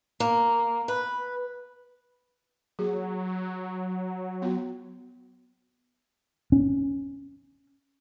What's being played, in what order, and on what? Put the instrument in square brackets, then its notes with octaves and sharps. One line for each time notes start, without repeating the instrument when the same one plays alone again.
[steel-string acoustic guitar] A#3
B4
[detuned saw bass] F#3 [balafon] A#3 G#4
[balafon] B3 F4 F#4
[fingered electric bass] C#4